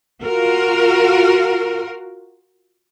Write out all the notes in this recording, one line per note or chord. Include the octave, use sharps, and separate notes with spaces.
F4 F#4 A#4